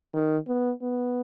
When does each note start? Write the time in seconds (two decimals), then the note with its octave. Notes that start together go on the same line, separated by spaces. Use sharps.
0.13 D#3
0.47 B3
0.81 B3